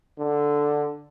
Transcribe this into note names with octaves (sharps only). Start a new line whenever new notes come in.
D3